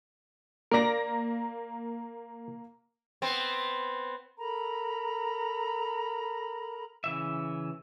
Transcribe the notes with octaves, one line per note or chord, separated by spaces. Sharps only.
A#3 A#4 D5 A#5 A#6
B3 C4
A4 A#4 A#5 B5
C#3 E3 E5